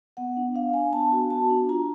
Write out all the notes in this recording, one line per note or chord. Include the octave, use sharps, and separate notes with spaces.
B3 F#5
D4
D4 F5
D4 G#5
B3 A5
F#4
B3 A5
D4
F4 A#5